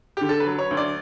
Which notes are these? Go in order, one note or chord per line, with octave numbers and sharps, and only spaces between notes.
D3 G4
A4
B4
F#3
C#5
D2
D5